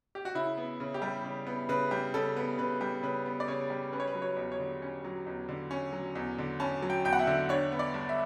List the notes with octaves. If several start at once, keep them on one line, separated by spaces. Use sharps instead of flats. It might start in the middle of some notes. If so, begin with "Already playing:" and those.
G4
F#4
C#3 E4
B3
C#3
G4
G3
C#3
B3
C#3 B4
G3
C#3 A4
B3
C#3 B4
G3
C#3 B4
B3
D5
C#3 C#5
G3
C#4 B4
C#5
B4
F#3
C#5
E2
C#5
D3
C#4
F#3
E2
D3
C#4
F#3
E2
D3
C#4 A5
F#3
G5
E2 G5
F#5
E5
D3
D4 C#5
B3
D5
G2
E5